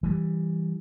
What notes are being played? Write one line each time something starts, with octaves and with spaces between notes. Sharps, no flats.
E3 G3